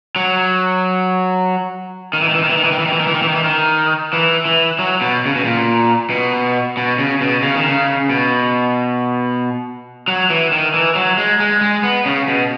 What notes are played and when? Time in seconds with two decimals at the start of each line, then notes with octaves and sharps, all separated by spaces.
0.16 F#3
2.13 D#3
2.22 E3
2.29 D#3
2.35 E3
2.43 D#3
2.50 E3
2.57 D#3
2.64 E3
2.72 D#3
2.79 E3
2.86 D#3
2.93 E3
3.00 D#3
3.07 E3
3.15 D#3
3.22 E3
3.28 D#3
3.36 E3
3.43 D#3
4.13 E3
4.45 E3
4.79 F#3
5.01 B2
5.25 C#3
5.35 B2
5.44 A#2
6.10 B2
6.77 B2
6.99 C#3
7.21 B2
7.42 C#3
7.55 D#3
7.67 C#3
8.10 B2
10.08 F#3
10.30 E3
10.52 D#3
10.74 E3
10.95 F#3
11.18 G#3
11.40 G#3
11.61 G#3
11.83 B3
12.06 C#3
12.28 B2